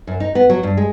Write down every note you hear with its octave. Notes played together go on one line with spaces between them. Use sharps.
F#2
D#4
B3
F#3
G2
G#3